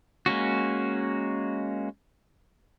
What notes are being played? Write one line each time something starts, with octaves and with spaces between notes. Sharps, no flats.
G#3 A#3 C#4 F#4